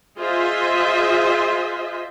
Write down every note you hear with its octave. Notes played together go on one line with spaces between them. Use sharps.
F4 G#4 C5 D#5 E5